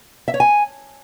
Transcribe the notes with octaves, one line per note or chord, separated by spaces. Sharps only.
E5
C#5
G#5